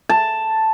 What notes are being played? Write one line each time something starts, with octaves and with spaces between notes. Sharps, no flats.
A5